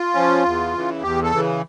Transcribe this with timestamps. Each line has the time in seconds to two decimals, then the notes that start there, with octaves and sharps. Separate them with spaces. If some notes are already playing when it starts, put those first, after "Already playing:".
Already playing: F4
0.14 F3 C#4
0.45 E2
0.74 C#3 E3
1.02 E2 G4
1.23 A4
1.32 C#3 E3